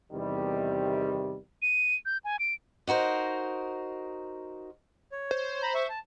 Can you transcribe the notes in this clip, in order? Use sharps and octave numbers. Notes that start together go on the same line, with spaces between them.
E2 C3 D#3 G3
D#7
G6
G#5
D7
D#4 F#4 A#4 C5
C#5
C5
A#5 B5
E5 C#6
A5